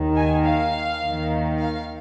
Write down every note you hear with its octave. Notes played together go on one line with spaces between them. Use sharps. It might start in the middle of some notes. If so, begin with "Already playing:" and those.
Already playing: D#2 D#3
G#5
F5
D#2 D#3
F5